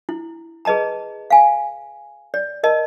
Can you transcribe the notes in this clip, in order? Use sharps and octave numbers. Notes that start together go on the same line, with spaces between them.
E4
G#4 B4 D#5 A5 A#5
F5 G#5
D5
A#4 D#5 A5